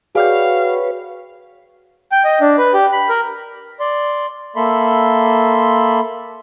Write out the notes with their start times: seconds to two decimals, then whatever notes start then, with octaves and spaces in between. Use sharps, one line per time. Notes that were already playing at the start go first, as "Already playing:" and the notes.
0.15 F#4 G#4 B4 C#5 D5 F5 G5
2.12 G5
2.25 D#5
2.41 D4
2.58 B4
2.74 G4
2.92 B5
3.09 A#4
3.80 D5 C6
4.56 A#3 A4 E5 B5 C6